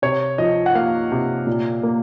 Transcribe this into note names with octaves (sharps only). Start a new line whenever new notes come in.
C3 C#5
F3 D#5
F#5
A#3 F5
C3
A#2
A#3